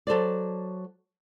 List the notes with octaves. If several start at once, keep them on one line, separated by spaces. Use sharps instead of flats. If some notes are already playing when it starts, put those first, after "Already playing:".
F#3 A4 C5 D5